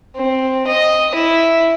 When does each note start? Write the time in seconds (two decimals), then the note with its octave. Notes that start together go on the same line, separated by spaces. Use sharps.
0.16 C4
0.67 D#5
1.15 E4